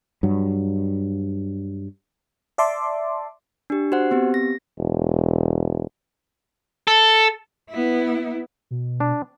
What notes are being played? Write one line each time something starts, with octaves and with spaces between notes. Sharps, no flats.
G2 F#3
D5 E5 A5 C6 D6
D4 G4
F#4 C5 F#5
B3 C4 G4
A#6
E1
A4
B3 E4
B2
D4